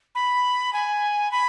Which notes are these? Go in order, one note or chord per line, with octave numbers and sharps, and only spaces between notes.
B5
G#5
B5